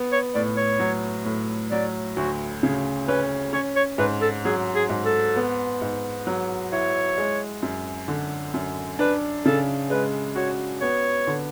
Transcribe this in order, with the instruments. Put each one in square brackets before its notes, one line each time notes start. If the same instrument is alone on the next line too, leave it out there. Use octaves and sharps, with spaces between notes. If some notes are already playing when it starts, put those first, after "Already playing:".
Already playing: [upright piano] B3
[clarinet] C#5
[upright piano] A2 [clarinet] D5
[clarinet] C#5
[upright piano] F#3
A2
[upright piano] F#3 [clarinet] D5
[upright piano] D2 [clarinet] F#4
[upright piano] C#3 [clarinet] G#4
[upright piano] C#4 [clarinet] B4
[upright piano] C#4 [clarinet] C#5
[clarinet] C#5
[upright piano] G#2 [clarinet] B4
[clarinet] A4
[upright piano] F#3 [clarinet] G#4
[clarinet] G#4
[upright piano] G#2
[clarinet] A4
[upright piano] B3
G#2
F#3
[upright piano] E4 [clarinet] C#5
[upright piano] G#3
F#2
D3
F#2
[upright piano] D4 [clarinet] B4
[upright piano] C#3 [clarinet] A4
[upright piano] G#3 [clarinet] B4
[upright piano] F#4 [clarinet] C#5
[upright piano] B3 [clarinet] C#5
[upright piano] D3